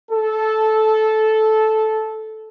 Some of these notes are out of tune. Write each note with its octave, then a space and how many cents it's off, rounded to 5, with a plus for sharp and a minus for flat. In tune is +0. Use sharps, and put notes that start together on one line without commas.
A4 -10